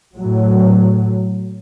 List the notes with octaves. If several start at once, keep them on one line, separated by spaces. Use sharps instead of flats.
A2 F#3